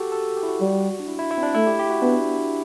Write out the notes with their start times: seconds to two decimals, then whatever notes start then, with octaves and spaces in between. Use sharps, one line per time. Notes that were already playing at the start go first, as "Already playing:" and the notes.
Already playing: F#4 G4 A4
0.12 A4
0.37 G4
0.43 E4
0.48 F#4
0.60 G3
1.00 D4
1.08 E4
1.19 E4
1.31 E4
1.38 C4
1.43 D4
1.55 A3 E4
1.67 G4
1.79 G4
1.90 F#4
2.02 B3 D4